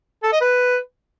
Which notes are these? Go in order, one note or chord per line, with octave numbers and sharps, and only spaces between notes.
A4
D#5
B4